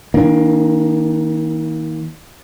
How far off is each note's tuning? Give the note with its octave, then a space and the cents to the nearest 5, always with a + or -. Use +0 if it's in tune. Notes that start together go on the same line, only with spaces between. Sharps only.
D#3 +40 A#3 +10 D4 +0